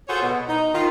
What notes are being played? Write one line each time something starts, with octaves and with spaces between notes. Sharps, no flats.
F4 F#4 G#4 A4 C5 C#5
B2
D#4
D#3 F4